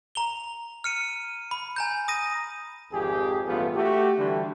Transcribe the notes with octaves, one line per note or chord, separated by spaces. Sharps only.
A#5 F7 G7
F6 C#7 D#7
B5
G#5 A#5 G6
D#6 A#6 D#7
G#1 F2 G4 G#4
A1 G2 B3 F4 A4
A3 F#4 G4
D3 E3 G3 D4